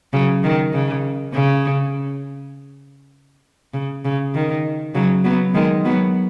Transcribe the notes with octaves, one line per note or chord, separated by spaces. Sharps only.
C#3 F#3
D#3
C#3
C#3
C#3
C#3
D#3
C#3 F#3
F#3 B3
D#3 G#3
F#3 B3